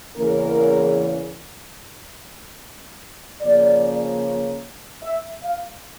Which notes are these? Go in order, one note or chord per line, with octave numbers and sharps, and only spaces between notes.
E2 C#3 E3 A#3 C#4 A#4
C#3 F3 A#3 C#4 D5
E5
F5